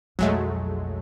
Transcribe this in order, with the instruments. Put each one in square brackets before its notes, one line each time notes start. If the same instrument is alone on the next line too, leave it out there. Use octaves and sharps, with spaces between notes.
[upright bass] B1 F2 [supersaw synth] F#3 G#3 A3